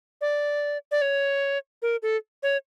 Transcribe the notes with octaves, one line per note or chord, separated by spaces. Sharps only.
D5
D5
C#5
A#4
A4
C#5